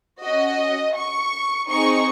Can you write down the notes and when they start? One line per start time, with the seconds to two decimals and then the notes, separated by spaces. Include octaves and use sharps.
0.23 C#4 F#4 D#5
0.97 C#6
1.69 C4 D#4 G#4 C#6